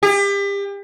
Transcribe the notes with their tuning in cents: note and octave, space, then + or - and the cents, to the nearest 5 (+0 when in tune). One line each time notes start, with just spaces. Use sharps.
G4 +35